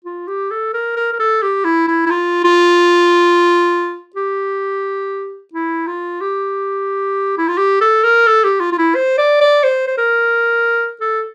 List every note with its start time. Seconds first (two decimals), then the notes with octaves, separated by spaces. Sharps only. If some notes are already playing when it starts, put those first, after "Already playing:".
0.05 F4
0.28 G4
0.51 A4
0.74 A#4
0.96 A#4
1.13 A#4
1.20 A4
1.42 G4
1.65 E4
1.88 E4
2.06 E4
2.10 F4
2.45 F4
4.16 G4
5.53 E4
5.87 F4
6.21 G4
7.38 E4
7.48 F4
7.58 G4
7.81 A4
8.04 A#4
8.27 A4
8.44 G4
8.61 F4
8.72 F4
8.78 E4
8.95 C5
9.18 D5
9.41 D5
9.64 C5
9.87 C5
9.98 A#4
11.01 A4